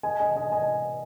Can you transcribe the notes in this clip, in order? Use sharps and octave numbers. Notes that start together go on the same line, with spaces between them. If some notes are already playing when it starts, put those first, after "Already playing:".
D#5 G#5
D#5 G#5
D#5 G#5
D#5 G#5